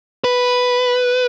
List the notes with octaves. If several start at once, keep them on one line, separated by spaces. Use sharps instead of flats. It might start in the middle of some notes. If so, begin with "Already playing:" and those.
B4